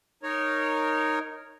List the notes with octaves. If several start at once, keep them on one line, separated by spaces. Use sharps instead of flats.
D#4 A#4 C#5